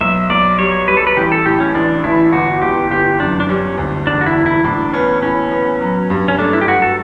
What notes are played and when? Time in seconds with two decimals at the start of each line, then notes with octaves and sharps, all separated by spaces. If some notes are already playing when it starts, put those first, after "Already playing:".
0.01 B1 E5
0.30 B1 D5
0.59 G3 C#5
0.88 G3 B4
0.97 A4
1.07 B4
1.17 A1 G4
1.32 A4
1.46 A2 G4
1.60 C#4
1.75 A1 D4
2.04 A1 E4
2.33 G1 F#4
2.61 G1 G4
2.90 G1 G4
3.20 F#2 D4
3.40 D4
3.49 G3 C#4
3.78 D2
4.07 E1 D4
4.21 F#4
4.26 E4
4.36 E1
4.46 E4
4.64 A2 D4
4.94 B3 C#4
5.23 A2 C#4
5.51 B3
5.81 F#3
6.10 G2
6.28 C#4
6.39 A3 D4
6.53 E4
6.61 G4
6.67 G2 F#4
6.82 A4